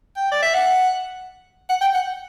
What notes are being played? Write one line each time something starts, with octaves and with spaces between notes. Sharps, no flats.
G5
D5
E5
F#5
F#5
G5
F#5